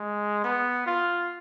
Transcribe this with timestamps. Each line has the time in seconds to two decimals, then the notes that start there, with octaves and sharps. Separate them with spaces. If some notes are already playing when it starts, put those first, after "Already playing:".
Already playing: G#3
0.44 B3
0.86 F4